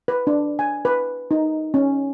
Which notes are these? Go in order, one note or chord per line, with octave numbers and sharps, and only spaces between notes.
B4
D4
G#5
B4
D#4
C#4